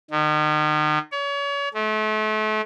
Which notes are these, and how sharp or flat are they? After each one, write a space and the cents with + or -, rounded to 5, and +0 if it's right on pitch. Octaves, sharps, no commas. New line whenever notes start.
D#3 -35
C#5 +35
A3 -35